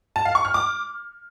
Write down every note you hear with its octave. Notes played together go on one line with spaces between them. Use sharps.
A5
F5
C#6
F6
D6